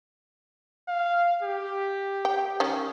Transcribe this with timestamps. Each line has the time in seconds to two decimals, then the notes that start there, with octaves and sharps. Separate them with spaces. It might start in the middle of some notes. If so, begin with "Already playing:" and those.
0.88 F5
1.43 G4
2.25 G5
2.60 D#3 C#4